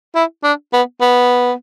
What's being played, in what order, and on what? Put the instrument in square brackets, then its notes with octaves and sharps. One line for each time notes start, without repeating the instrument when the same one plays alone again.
[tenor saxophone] E4
D4
B3
B3